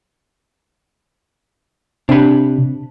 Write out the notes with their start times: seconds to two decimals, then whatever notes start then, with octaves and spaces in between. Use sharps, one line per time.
2.09 C3 D4 B5